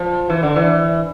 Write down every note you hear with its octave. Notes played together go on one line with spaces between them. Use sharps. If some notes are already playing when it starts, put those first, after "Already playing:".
Already playing: F3
E3
D3
E3